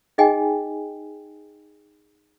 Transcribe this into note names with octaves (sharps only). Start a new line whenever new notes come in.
D#4 G#4 D#5 G5 G#5